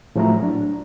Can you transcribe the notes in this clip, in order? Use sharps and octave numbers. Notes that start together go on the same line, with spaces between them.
A2 F3 F#3 A3 E4 A#5
D4